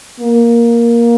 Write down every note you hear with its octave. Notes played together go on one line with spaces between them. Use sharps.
A#3